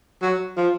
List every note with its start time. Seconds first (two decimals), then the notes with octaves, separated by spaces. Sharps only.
0.22 F#3
0.57 F3